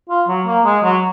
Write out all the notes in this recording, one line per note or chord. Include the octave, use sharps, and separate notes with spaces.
F4
F#3
A#3
G#3
F#3